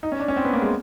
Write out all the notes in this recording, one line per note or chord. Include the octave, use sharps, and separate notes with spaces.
D#4
C#4
D4
C#4
C4
B3
A#3
G#3